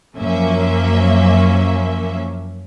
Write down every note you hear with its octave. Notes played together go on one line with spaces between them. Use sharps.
F#2 F3 F#3 A#3 C#4 E5